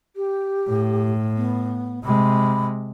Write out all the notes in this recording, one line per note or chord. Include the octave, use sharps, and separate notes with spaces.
G4
A2
B3
C3 G#3 B5